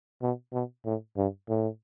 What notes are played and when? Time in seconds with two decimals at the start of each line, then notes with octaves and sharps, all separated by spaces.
0.22 B2
0.53 B2
0.85 A2
1.17 G2
1.49 A2